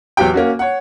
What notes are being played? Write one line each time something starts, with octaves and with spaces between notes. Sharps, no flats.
E2 F#3 G4 G5
A#3 C#4 F#4
C#5 F#5